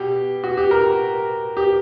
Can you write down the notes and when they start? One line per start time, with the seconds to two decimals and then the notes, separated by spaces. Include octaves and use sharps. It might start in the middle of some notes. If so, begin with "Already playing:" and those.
Already playing: B2 G4
0.44 F#4
0.57 G4
0.71 A#4
1.57 G4